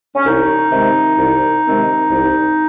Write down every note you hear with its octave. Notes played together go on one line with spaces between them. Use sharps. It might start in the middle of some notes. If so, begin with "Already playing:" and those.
C#4
C2 D#4
C3 D#3 G#3 C4
C2
C3 D#3 G#3 C4
C2